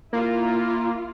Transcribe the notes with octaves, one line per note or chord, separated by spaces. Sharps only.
A#3 E4 F4